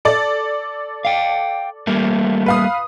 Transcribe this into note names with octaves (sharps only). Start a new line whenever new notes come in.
A4 D5
F5 G5
G3 A3 A#3
B4 F5 D#6